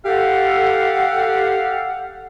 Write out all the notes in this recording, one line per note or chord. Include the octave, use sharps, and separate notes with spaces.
G4 A4 F5 F#5